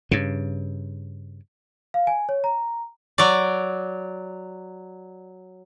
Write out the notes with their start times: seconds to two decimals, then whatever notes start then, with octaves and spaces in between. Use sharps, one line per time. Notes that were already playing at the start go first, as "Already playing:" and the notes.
0.11 G2 C#3
1.94 F5
2.07 G#5
2.29 C#5
2.44 A#5
3.18 F#3 D5